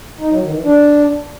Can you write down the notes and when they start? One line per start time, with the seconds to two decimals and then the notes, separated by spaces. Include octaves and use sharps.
0.19 D#4
0.30 F#3
0.42 D#3
0.53 E3
0.64 D4